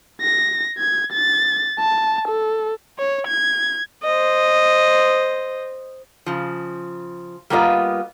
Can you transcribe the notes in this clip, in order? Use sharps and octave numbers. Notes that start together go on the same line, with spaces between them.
A#6
G#6
A6
A5
A4
C#5
G#6
C5 D#5
C#3 F3
G3 A#3 B3 F4 B4 D#5